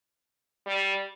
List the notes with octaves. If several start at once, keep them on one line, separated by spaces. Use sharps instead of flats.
G3